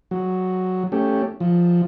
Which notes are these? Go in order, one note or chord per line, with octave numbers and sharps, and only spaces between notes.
F#3
A3 C#4 G4
F3